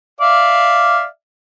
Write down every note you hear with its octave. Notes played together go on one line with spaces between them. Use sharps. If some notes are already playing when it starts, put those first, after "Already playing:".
D5 E5 F5